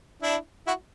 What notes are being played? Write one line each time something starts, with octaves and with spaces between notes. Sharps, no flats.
D4 E4
E4 F#4